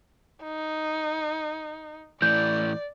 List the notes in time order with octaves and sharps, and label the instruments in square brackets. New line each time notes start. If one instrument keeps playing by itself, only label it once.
[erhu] D#4
[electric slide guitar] A2 E3 [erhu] D5 [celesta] G6